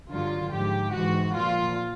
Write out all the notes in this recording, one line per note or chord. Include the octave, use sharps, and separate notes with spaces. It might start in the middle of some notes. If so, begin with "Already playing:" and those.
G2 D3 F#3 F4
G#2 F3 G4
G#2 E3 F#4
A#2 F3 F4